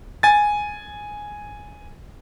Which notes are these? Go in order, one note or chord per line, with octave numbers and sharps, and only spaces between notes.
G#5 A6